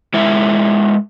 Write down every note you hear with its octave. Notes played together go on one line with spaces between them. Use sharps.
G#3 E4 A#4 E5